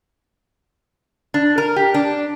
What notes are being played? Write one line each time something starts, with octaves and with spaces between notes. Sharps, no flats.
D4
A#4
G4
D4